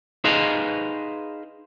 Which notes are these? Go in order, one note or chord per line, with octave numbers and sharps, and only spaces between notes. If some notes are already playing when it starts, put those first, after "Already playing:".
D#4 G#4 B4 C5 D#5 F5